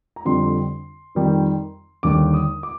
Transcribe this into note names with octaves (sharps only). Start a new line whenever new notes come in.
A#5
F2 D3 G3 C6
F2 D#3 G3
D#2 D3 G3 D6
D#6
D6